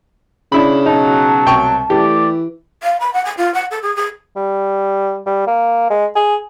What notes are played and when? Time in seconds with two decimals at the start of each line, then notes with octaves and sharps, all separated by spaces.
0.52 C#3 D4 E4 B5
0.86 B2 F#3 D#4 A5
1.46 C2 G5 C#6
1.90 E3 A3 G4 D5
2.83 F5
3.00 B5
3.13 F#5
3.25 G#5
3.37 F4
3.54 F#5
3.71 A4
3.82 G#4
3.96 G#4
4.36 G3
5.26 G3
5.47 A#3
5.90 G#3
6.16 G#4